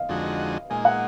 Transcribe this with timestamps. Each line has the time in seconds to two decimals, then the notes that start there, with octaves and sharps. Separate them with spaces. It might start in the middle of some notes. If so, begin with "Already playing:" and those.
Already playing: D#5 F5
0.09 F2 D3 G#3 D#4 F#4
0.70 A#2 G#3 D#4 G#5
0.85 F#5